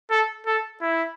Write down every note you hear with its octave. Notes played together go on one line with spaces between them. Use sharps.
A4
A4
E4